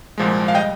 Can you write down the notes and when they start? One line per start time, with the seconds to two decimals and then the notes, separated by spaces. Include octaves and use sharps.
0.18 C2 A#2 F3 G#3
0.48 F5
0.54 G3 D#5 G5